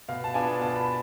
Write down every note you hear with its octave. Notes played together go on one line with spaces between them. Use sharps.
B2 F5
A5
B3 D4 F4 G#5
B2 A5
B5